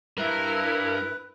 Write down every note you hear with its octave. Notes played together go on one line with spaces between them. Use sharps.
G2 E4 A#4 B4